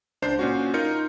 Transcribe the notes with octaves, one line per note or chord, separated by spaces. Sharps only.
C#2 D4 C5 G6 C7
A#2 C#4 F#4
D#4 F4 A#4 G6 C#7